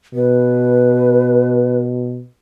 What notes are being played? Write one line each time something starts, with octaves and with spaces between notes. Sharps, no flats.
B2 B4